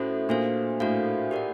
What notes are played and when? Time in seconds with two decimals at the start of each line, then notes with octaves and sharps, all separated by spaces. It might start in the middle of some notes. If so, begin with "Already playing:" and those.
Already playing: A2 C#4 F#4 A4 C5
0.29 A#2 D4 F#4 A4 C5 F5
0.80 A2 D4 F#4 A4 C5 F5
1.31 G4 A#4 D5 F#5